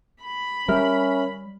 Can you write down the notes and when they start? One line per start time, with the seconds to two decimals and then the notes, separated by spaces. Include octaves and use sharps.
0.22 B5
0.68 G3 C#4 A#4 E5 F6